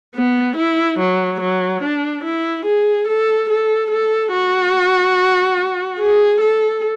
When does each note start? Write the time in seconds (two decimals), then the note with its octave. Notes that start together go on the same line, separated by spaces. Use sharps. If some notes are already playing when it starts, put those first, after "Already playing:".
0.15 B3
0.56 E4
0.99 F#3
1.40 F#3
1.83 D4
2.24 E4
2.65 G#4
3.07 A4
3.49 A4
3.91 A4
4.32 F#4
5.99 G#4
6.41 A4